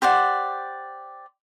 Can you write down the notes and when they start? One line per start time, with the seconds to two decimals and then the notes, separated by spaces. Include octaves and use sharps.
0.02 G4 C5 D5 F#5